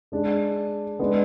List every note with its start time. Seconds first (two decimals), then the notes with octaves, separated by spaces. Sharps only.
0.12 G#3 D4 G#4
0.99 G#3 B3 D4